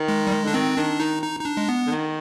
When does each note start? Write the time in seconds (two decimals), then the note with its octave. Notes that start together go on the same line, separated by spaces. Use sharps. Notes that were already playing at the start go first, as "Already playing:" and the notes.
Already playing: D#3
0.08 G#3
0.27 G3
0.31 G#3
0.44 D3 D4
0.54 D#3 C4
0.77 D#3 D4
1.00 D#3 D#4
1.23 D#4
1.40 D#4
1.45 D4
1.57 G#3
1.69 B3
1.87 D3
1.91 D#3